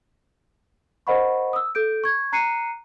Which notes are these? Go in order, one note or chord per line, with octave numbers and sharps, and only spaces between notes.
A#4 C5 D#5 F#5 B5 C#6
D#6 E6
A4 G6 D7
C#6 G#6
A#5 F#6 C7 C#7 D#7